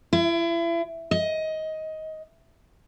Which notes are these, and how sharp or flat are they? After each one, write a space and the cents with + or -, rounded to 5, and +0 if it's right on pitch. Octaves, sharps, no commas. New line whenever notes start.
E4 +35
D#5 +15